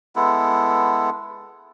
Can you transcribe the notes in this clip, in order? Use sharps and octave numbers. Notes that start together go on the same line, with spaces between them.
G#3 B3 E4 A4